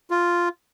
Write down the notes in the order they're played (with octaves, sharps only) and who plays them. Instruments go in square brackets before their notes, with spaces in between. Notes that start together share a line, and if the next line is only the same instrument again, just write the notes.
[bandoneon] F4